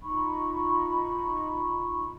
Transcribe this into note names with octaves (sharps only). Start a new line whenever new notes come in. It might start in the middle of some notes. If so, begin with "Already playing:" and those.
D#4 F4 B5 C#6